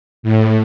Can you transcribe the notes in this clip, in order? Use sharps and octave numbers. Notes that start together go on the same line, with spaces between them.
A2